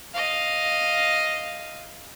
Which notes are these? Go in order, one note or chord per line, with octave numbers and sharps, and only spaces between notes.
D#5 F5